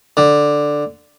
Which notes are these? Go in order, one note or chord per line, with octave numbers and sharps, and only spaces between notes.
D3